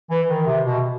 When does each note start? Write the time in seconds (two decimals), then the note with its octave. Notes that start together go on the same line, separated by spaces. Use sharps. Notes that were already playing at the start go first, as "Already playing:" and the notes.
0.10 E3
0.29 D#3
0.47 C3
0.66 B2